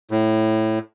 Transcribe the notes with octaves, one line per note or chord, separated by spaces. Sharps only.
A2